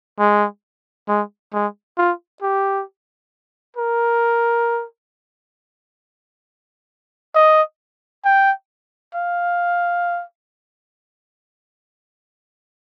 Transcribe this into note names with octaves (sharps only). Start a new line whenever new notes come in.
G#3
G#3
G#3
F4
G4
A#4
D#5
G5
F5